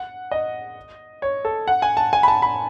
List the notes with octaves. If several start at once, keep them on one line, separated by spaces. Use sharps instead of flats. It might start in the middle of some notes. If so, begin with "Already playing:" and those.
Already playing: F#5
D#5
C#5
A4
F#5
G#5
A5
G#5
B5
A5
B5